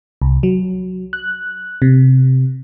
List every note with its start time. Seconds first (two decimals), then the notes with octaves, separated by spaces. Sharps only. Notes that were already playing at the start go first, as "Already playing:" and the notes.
0.22 C2
0.43 F#3
1.13 F#6
1.82 C3